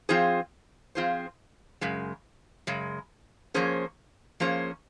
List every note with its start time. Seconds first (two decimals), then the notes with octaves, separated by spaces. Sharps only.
0.09 F3 C4 F4 G#4 C5
0.95 F3 C4 F4 G#4 C5
1.81 F#2 C#3 G#3
2.67 F#2 C#3 G#3
3.54 F3 A#3 C#4 G#4 C5
4.40 F3 A#3 C#4 G#4 C5